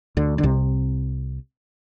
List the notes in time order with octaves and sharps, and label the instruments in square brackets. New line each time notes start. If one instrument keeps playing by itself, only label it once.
[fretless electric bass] D2 D3
D3
C2 C3